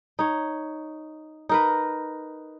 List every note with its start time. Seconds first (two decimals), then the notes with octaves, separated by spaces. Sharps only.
0.19 D#4 C#5
1.49 D#4 A#4 B4